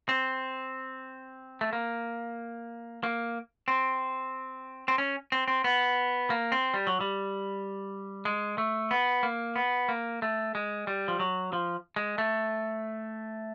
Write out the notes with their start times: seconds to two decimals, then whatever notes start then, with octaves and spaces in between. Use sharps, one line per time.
0.09 C4
1.61 A3
1.73 A#3
3.03 A#3
3.68 C4
4.88 C4
4.98 C#4
5.32 C4
5.48 C4
5.64 B3
6.30 A#3
6.52 C4
6.74 G3
6.87 F#3
7.01 G3
8.25 G#3
8.58 A3
8.91 B3
9.23 A#3
9.56 B3
9.89 A#3
10.22 A3
10.55 G#3
10.87 G3
11.08 F3
11.19 F#3
11.53 F3
11.96 G#3
12.18 A3